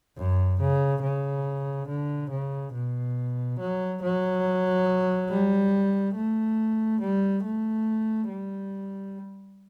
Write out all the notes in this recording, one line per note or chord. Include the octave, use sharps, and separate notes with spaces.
F#2
C#3
C#3
D3
C#3
B2
F#3
F#3
G3
A3
G3
A3
G3